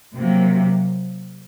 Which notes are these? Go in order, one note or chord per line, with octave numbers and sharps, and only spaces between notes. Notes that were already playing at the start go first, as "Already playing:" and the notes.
C3 F#3 A#3